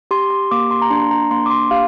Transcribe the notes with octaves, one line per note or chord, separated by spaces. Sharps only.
G4 C6
C6
A#3 D6
C6
A#5
D4 C6
A#5
A#3 C6
D6
C6
G4 F5